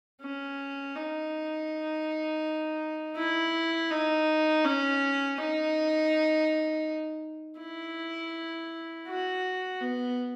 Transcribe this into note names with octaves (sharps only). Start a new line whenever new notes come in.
C#4
D#4
E4
D#4
C#4
D#4
E4
F#4
B3